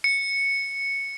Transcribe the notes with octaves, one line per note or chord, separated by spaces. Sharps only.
C#7